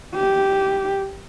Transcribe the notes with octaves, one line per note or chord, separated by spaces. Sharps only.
G4